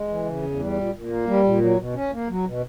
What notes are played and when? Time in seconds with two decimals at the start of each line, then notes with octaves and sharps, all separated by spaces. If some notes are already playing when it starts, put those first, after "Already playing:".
Already playing: G#3
0.08 E3
0.25 C#3
0.42 E2
0.59 G3
0.76 A#2
0.93 A#2
1.09 A#3
1.27 G3
1.44 A#2
1.61 F#3
1.78 B2
1.95 C#4
2.12 A#3
2.29 F#3
2.46 B2